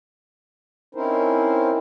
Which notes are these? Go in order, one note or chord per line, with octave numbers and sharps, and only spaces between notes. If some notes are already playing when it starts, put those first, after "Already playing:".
C4 C#4 D#4 E4 A#4 C5